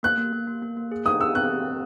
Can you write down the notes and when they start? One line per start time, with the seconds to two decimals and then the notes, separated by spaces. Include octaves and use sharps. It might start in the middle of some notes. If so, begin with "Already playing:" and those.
0.03 A#3 F#6
0.18 A#3
0.33 A#3
0.48 A#3
0.62 A#3
0.77 A#3
0.92 G#4
1.06 D#4 D#6
1.21 G#4 E6
1.35 C4 F#6
1.50 C4
1.65 C4